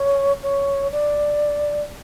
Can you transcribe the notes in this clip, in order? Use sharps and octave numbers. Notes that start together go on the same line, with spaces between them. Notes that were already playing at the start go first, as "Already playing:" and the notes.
Already playing: C#5
C#5
D5